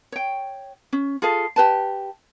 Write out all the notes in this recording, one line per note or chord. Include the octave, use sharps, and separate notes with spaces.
C#5 G5
C#4
F4 G#4 A4 F5
G4 B4 A5